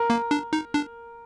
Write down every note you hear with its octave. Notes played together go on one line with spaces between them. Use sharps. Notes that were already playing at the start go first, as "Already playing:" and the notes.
Already playing: A#4
A#3
D4
D#4
D4